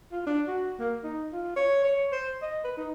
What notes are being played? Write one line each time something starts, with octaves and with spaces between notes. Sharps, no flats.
F4
D4
F#4
A#3
D#4
F4
C#5
C#5
C5
D#5
B4
D#4